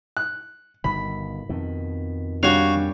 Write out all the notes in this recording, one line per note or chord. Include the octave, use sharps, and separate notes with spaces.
F#6
G1 B2 D#3 B5
F2 B2 D#3
G3 D4 F#4 C#5 F5